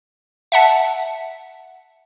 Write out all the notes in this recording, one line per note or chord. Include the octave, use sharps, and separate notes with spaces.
E5 F#5 A5